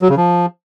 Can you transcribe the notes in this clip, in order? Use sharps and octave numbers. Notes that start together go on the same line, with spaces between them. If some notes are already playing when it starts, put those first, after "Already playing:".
F#3
C#3
F3